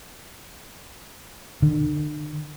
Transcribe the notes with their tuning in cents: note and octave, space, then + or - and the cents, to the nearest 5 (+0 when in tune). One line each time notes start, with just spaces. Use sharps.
D3 +45